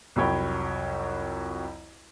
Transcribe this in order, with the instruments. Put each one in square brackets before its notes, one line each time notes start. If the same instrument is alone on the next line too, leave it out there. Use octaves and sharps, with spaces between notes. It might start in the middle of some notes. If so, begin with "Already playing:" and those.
[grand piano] C2 F2 F#3 C#5 G5 B5